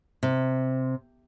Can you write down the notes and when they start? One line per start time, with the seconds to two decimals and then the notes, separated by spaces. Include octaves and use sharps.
0.23 C3